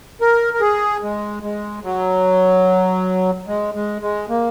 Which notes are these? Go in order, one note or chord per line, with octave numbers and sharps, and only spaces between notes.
A#4
A#4
G#4
G#3
G#3
F#3
G#3
G#3
G#3
A#3